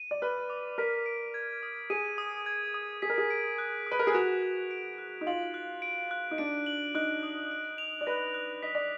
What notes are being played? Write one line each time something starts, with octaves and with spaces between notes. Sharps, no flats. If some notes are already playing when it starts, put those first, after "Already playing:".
Already playing: D#7
D5
B4 F6
D6
A#4 B6
D7
G#6
D#6
G#4 D#7
D#6
G#6
D#6
G#4 B6
A#4
G#4
D7
F#6
B4 D#6
A#4
G#4
F#4 F7
F#6
D7
F#6
D#4
F4 F#7
F#6
D7
F#6
D#4
D4 D7
F#7
D#4 F#6
D#6
D7
F7
D5
B4 A#6
F#6
D#5 B6
D5